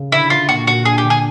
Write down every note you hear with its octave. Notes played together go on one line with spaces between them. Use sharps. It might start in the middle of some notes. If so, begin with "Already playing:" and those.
Already playing: C#3
D3 E4
D3 F4
A#2 F#4
A#2 F#4
D4 G#4
G4
D3
G#4